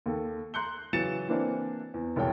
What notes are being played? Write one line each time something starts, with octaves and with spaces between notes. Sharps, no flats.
D#2 A4
A#5 C6 F#6 G6 C#7 G7
C#3 E3 F#3 A6 C#7 E7
E3 A#3 C4 D4 E4
E2
E1 C2 F#2 C#5 G5 A5